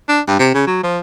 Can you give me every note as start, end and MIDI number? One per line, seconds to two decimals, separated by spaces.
0.09 0.21 62
0.28 0.38 43
0.39 0.49 48
0.54 0.66 49
0.67 0.80 54
0.83 0.99 53